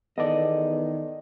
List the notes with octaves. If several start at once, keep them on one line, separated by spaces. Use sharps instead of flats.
E2 D#3 B3 A4 D5 D#5